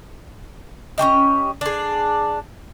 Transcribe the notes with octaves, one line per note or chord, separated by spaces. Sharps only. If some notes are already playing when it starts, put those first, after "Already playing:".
C#4 F#4 G4 D#5
D4 G#4